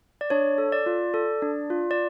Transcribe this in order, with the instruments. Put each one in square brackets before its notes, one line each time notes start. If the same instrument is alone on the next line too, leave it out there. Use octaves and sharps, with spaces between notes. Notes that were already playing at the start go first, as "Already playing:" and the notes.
[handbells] D5
D4 C#5
A4
D5
F4
A4
D4
F4
D5